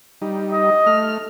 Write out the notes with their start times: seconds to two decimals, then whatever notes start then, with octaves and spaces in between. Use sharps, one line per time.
0.22 G3 D#4
0.52 D#5
0.86 A3 F6